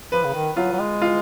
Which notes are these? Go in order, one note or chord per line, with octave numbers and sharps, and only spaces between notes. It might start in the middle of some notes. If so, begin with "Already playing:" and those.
F3 B4
C#3
D#3
F#3 F4
F#3
G#3
F4